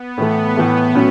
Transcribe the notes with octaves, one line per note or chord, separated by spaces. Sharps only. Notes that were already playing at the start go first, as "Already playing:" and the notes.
Already playing: B3
A2 E3 A3
A2 E3 A3
A2 F#3 C#4